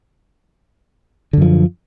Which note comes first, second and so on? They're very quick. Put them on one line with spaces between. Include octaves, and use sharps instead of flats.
D3 F#2 F3